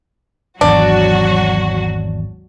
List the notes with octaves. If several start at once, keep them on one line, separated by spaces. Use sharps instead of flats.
G#1 E2 F#3 D4 F#4